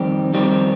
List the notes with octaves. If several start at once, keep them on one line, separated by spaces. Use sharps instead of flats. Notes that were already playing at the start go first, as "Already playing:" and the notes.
Already playing: F2 D#3 G3 C4 G4
F2 D#3 G3 C4 G4